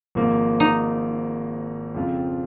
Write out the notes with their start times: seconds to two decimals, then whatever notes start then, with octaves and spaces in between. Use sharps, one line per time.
0.15 G#1 G#2 F3 A#3
0.60 D#4
1.95 F2 C#3 F3 C4 F4